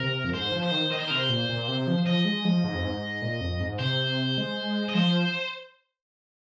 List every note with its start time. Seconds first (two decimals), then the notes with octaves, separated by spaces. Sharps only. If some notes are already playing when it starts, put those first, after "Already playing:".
Already playing: C3 A#4
0.24 F2
0.34 G#2 C5
0.52 F3
0.62 C5
0.71 D#3
0.90 D#3 D#5
0.99 C5
1.07 C3 A#4
1.16 C5
1.29 A#2
1.49 A#2
1.68 C3
1.87 F3
2.06 F3 D#5
2.25 G#3
2.45 F3
2.64 G#2
2.75 F2
2.84 G#2
3.22 A#2
3.41 F2
3.60 G#2
3.79 C3 C5
4.38 G#3
4.89 D#5
4.95 F3 C5